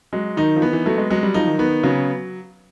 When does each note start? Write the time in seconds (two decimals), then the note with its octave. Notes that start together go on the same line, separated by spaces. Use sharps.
0.13 F#3 G#3
0.37 D#3 D#4
0.56 F3
0.62 E3 B3
0.73 E3
0.86 F#3 A3
0.97 G#3
1.10 F#3 G#3
1.23 G3
1.34 F3 D#4
1.47 D#3
1.58 D#3 B3
1.83 C#3 F#3